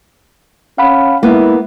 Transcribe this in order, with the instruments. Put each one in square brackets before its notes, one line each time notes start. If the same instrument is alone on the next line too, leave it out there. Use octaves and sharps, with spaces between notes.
[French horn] C#4 [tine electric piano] F5 F#5 B5
[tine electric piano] G#3 [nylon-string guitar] A#3 B3 [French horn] E4